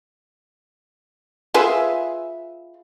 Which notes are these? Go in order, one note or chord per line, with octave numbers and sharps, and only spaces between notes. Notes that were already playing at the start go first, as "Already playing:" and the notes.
F4 G#4 B4 E5